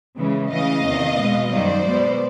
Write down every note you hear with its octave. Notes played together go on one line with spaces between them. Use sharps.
C#3 E3 G#3
C#3 E3 A3 D#5 F5
E2 C3 D#3
B2 G#3 B3
F#2 D#3 G3 C5 D5
B2 G#3 B3